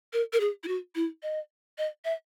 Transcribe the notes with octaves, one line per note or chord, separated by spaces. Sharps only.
A#4
A#4
G#4
E4
F#4
E4
D#5
D#5
E5